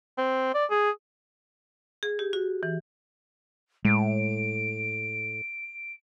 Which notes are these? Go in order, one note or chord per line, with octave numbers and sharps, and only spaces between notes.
C4
D5
G#4
G#4
G4
F#4
E3
A2 G#3 D7